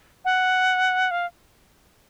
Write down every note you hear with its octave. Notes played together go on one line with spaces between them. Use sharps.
F#5
F5